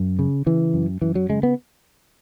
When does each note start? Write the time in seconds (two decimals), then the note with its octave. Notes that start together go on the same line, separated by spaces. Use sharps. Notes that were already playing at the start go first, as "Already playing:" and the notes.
Already playing: F#2
0.19 C#3
0.46 C#3 E3
0.74 F#2
1.02 F#2 E3
1.15 F#3
1.30 C#3 G#3
1.43 B3